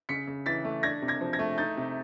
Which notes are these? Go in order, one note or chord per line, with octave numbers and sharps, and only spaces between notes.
C#3 B6 C#7
C#3
E3 A6 B6
A3
D4 G#6 A#6
C3
G#6 A#6
F3
G#6 A#6
A3
D#4 G6 A6
C3